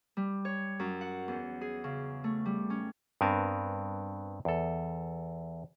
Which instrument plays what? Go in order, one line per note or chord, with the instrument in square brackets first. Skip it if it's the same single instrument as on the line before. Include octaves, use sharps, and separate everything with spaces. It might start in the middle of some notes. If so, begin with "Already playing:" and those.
[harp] G3
C#5
F#2
F#5
E2
G#4
C#3
A3
G3
C#4
[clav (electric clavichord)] G2 B3 C4 A#4 G#5 A5
E2 A4